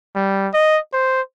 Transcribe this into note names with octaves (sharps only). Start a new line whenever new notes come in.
G3
D#5
C5